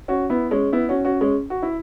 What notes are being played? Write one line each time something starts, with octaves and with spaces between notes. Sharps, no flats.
C#4 F#4
B3 E4
G#3 C#4
B3 E4
C#4 F#4
C#4 F#4
G#3 C#4
F#4
E4